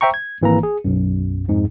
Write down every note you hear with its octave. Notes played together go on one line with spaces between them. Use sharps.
C5 E5 G5 A#5 C#6
G#6
G#1 E3 A#3 A#5
G#4
B1 F#2
F2 G#2